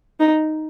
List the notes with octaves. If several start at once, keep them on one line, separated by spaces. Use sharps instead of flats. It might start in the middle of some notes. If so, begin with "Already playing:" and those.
D#4